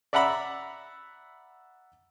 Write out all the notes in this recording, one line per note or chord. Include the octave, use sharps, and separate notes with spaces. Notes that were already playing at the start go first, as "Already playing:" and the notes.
D5 E5 F#5 A#5 B5 E6